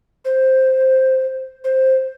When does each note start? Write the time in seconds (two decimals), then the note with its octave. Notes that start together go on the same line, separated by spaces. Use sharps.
0.25 C5
1.64 C5